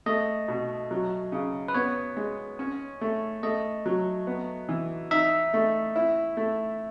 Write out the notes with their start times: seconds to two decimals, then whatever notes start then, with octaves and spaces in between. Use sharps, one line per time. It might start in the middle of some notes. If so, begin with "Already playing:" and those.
0.06 A3 D#5
0.48 B2
0.91 F#3
1.32 C#3
1.68 B4
1.74 B3 C#5
2.17 G#3
2.59 C#4
3.01 A3
3.43 A3 D#5
3.86 F#3
4.27 B3
4.69 E3
5.11 D#4 E5
5.53 A3
5.96 E4
6.37 A3